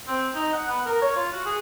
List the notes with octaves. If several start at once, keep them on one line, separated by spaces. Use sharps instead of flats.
C4
D#4
F#5
B3
A#4
C#5
F4
F#4
G#4